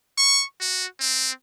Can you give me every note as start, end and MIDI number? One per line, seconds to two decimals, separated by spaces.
0.17 0.44 85
0.61 0.86 66
1.00 1.30 60